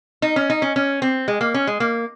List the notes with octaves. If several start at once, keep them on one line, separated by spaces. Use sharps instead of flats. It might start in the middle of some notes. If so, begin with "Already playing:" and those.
D#4
C#4
D#4
C#4
C#4
C4
G#3
A#3
C#4
G#3
A#3